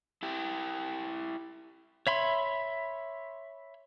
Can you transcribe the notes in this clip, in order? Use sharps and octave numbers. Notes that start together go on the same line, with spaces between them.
E4 G4
C#5 E5 B5 C6